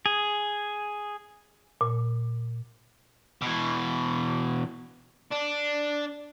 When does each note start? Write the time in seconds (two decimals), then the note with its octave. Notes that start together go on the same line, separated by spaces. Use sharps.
0.06 G#4
1.81 A#2
3.42 B2 E3
5.31 D4